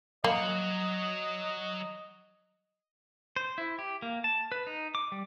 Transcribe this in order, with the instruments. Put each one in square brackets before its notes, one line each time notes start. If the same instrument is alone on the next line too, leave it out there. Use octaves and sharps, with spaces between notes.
[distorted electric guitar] F#3 F#5 [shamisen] A#3 [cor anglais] D#5
[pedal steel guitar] C5
E4
G4
A#3
A5
B4
D#4
D6
G3